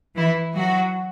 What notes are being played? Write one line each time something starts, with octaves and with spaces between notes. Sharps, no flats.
E3 E4
F#3 F#4